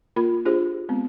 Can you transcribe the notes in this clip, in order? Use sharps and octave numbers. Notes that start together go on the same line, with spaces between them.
A#3 F4 A#4 B5
D4 F4 G4 G#4 C5
G#3 B3 C4